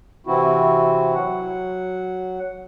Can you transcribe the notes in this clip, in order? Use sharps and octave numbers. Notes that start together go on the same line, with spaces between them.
C3 E3 C4 E4 F#4
F#3 F#5